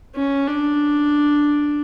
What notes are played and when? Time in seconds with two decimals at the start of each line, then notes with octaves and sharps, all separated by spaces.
0.15 C#4
0.47 D4